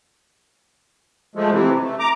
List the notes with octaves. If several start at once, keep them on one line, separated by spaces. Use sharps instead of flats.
F3 G#3 A3
C3 E3
A3
A#5 D6